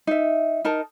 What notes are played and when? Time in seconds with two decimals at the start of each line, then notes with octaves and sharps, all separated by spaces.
0.07 D#4 E5
0.64 D#4 A#4 A5